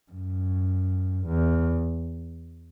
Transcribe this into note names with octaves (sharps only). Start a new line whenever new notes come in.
F#2
E2